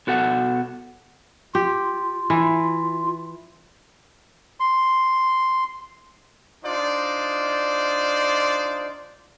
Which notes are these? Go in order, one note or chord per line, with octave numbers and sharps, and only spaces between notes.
B2 F#4 A4 F#5
F4 G4
E3
C6
D4 D#4 F4 C5 D5